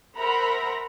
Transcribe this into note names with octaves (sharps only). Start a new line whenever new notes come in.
A#4 C5 E5 F#5 A#5 B5